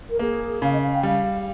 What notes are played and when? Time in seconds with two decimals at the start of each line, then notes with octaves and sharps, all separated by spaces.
0.10 A#4
0.19 A#3 G#4
0.62 C#3 F5
0.72 D#5
0.82 F5
0.93 G5
1.03 G3 F5